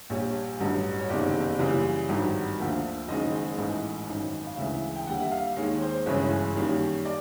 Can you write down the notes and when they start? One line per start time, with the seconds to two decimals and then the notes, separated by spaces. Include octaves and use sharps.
0.10 A#1 A#2 G3 C#5
0.60 A1 G2 D3 F#3
0.99 C#5
1.09 F#1 E2 C3 D#3 D5
1.59 F#2 C#3 E3 G3 A#3
2.09 G#1 G2 D#3 F#3
2.59 D2 D3 F3 A#3
3.08 F#1 F#2 D#3 G#3 D#5
3.57 A1 G#2 E3 A3 D#5
4.07 G#1 F#2 D#3
4.47 F5
4.57 D2 C#3 E3 G#3 E5
4.96 G5
5.07 D#2 D3 G3 F#5
5.21 E5
5.32 F5
5.56 D#2 D#3 G#3 C#5
5.81 C5
6.06 G1 F#2 C#3 E3 G#3 C#5
6.56 F#2 D#3 G3 A#3
7.05 D5